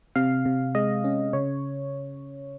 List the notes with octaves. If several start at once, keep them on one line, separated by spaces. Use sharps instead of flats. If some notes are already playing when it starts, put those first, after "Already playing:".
C3 F5
C3
G#3 D#5
C#4
C#3 C#5